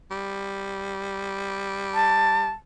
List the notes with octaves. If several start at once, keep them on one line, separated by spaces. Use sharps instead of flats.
G3
A5